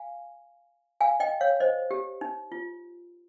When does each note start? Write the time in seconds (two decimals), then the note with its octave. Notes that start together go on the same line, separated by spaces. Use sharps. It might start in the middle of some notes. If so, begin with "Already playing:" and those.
Already playing: F5 G#5
1.01 F5 G#5
1.20 D#5 G5
1.41 C#5 F5
1.60 C5 D#5
1.91 G4
2.21 D#4
2.52 F4